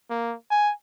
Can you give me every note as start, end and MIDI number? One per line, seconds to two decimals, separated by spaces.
0.10 0.35 58
0.51 0.72 80